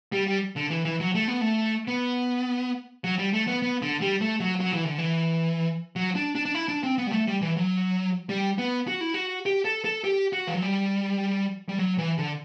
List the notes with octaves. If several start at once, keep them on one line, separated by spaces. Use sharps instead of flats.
G3
G3
D3
E3
E3
F#3
A3
B3
A3
B3
F#3
G3
A3
B3
B3
D3
G3
A3
F#3
F#3
E3
D3
E3
F#3
D4
D4
D4
E4
D4
C4
B3
G3
A3
G3
E3
F#3
G3
B3
F#4
E4
F#4
G4
A4
A4
G4
F#4
E3
F#3
G3
G3
F#3
E3
D3